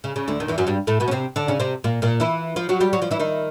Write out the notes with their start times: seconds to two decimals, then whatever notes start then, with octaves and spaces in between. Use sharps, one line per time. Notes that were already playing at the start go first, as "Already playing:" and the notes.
0.04 C#3
0.16 C#3
0.28 D2 D3
0.40 D#2 D#3
0.48 E2 E3
0.58 F#2 F#3
0.67 G2 G3
0.87 A2 A3
1.00 B2 B3
1.08 C#4
1.11 C3 C4
1.36 D3 D4
1.48 C#3 C#4
1.60 C3 C4
1.84 A#2 A#3
2.02 A#2 A#3
2.20 E3 E4
2.56 F3 F4
2.69 F#3 F#4
2.81 G3 G4
2.93 F#3 F#4
3.02 F3 F4
3.11 E3 E4
3.19 D#3 D#4